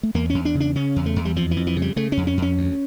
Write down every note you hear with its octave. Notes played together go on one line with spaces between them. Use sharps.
A3
E2 A#3
E2 C#4
D4
C#3
D4
C#3 C#4
E2
A3
E2
G3
F2 F3
E3
F2
E3
C#3
G3
C#3 A3
C#4
F2
C#4
F2 C#4
D2